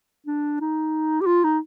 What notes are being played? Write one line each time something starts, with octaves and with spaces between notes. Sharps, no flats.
D4
D#4
G4
F4
D#4